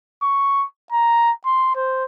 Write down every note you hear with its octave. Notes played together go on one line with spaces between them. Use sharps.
C#6
A#5
C6
C5